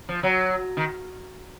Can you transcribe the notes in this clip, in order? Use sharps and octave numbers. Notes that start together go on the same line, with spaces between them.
F3
F#3
D#3